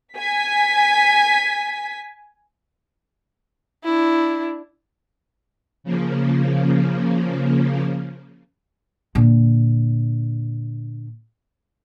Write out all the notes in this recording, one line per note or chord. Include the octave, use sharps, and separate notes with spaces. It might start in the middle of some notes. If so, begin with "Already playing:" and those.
G#5 B6
D4 E4
C#3 F3 A#3
A#2 D3